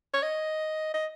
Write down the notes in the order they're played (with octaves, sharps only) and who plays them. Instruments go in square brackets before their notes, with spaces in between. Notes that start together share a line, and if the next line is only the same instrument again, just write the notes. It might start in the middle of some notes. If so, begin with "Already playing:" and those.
[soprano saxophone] C#5
D#5
D#5